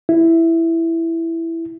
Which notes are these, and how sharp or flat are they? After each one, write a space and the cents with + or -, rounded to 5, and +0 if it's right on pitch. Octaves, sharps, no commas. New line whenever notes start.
E4 +5